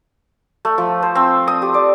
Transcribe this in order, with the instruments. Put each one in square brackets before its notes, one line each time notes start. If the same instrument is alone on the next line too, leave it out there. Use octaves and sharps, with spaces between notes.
[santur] A3
F3
C5
C4
D#6
G4
D5